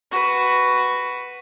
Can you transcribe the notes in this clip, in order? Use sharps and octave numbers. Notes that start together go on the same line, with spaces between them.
F#4 B4